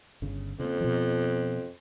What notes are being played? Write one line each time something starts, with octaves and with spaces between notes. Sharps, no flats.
G1 C#3
F2 C#3 A#3
B2 F3